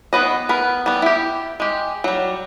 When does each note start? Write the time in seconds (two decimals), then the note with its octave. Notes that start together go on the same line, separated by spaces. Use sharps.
0.13 D#3 B3 B4 D#5
0.49 B3 A#4 B5
0.86 G3 B3
1.02 E4 G4
1.60 G#3 G4
2.04 F#3 G3